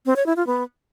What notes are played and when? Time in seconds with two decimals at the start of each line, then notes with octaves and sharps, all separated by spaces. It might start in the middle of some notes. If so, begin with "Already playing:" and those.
0.06 C4
0.16 C#5
0.26 E4
0.37 F4
0.47 B3